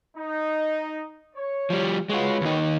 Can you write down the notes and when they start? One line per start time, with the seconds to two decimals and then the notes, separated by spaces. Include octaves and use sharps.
0.16 D#4
1.35 C#5
1.70 F3 G3
2.09 G#3 F4 F#4 B4 C#5
2.41 D#2 D#4